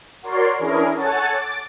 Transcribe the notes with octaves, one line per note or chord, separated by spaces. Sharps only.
F#4 A#4 C#5 D5 C6
E3 C#4 D4 E4 G#4 A#4
A4 C#5 F#5 G#5 A5 A6
D6 A6